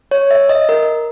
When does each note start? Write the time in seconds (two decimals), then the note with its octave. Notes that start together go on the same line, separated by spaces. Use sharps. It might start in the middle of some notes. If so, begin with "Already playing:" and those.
0.11 C#5
0.31 E5
0.49 D#5
0.69 A#4